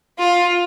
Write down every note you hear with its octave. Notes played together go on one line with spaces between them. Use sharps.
F4